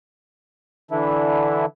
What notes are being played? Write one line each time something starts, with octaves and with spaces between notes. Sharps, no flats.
D3 E3 D4 E4